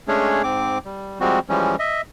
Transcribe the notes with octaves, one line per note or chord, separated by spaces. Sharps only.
G#3 A3 C#4 D4 G#4 C#5
G#2 C4 D6
G3
F3 G3 G#3 C4 F#4
E3 F3 G3 G#3 C#4
D#5 E5